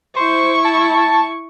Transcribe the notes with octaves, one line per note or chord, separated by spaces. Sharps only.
E4 C5 C#6
A5